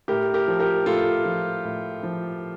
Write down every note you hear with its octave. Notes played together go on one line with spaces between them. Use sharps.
A2 G4 A#4
G4 A#4
F3
G4 A#4
A2 F4 A4
F3
A2
F3